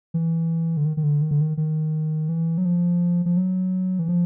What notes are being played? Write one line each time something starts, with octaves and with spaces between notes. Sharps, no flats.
E3
D3
D#3
D#3
D3
D#3
D3
D#3
D#3
E3
F#3
F3
F3
F#3
E3
F3